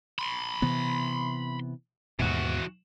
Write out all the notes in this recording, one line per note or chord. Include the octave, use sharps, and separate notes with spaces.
B5 C6
C3 E3 B3
D#2 G#2 B2 E3 F#4